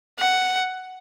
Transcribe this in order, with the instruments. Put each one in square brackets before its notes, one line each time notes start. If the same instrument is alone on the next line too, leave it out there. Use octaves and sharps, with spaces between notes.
[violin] F#5